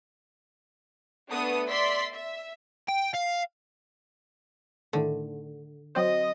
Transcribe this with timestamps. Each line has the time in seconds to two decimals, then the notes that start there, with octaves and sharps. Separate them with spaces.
1.29 A3 B3 D4 D#6
1.68 D5 E5 C6 B6
2.11 E5
2.88 G5
3.14 F5
4.93 A2 D3 D#3 A3
5.95 F#3 C4 C5 D#5